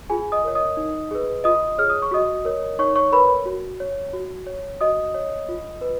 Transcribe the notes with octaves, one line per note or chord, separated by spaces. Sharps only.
F4 G#4 G#5
D#5 D#6
A#4 C#5
D#5 D#6
D#4
G#4 B4
F4 D#5 D#6
G#4 C#5 F6
D#6
C#6
F#4 D#5 D#6
A#4 C#5
D#4 C#5 C#6
C#5 C#6
A#4 B4 C#5 B5
F#4
C#5
F#4
C#5
F#4 D#5 D#6
C#5
F4
B4